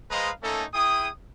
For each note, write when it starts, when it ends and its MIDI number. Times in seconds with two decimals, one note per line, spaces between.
0.11 0.30 56
0.11 0.30 71
0.11 0.30 72
0.11 0.30 75
0.11 0.30 77
0.11 0.30 82
0.43 0.64 57
0.43 0.64 58
0.43 0.64 61
0.43 0.64 63
0.43 0.64 69
0.74 1.09 64
0.74 1.09 68
0.74 1.09 79
0.74 1.09 87